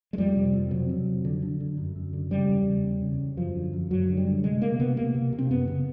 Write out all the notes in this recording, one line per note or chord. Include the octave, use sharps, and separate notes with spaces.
G#3
F2 G3
C3
F2
C3 F#3
C3
F2
D3
D3
D3
F#2
F#2
D3
C#3 G3
E2
C#3
E2
C#3
E2
F#2 F3
D3
F#2
F#2 F#3
D3
G3
D3
C3 G#3
C3 A#3
C3 B3
C3 A#3
C3
C3
C4
F#2 B3
C#3